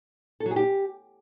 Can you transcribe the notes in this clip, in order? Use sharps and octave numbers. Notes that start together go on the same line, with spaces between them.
A4
F#3
G#4
G4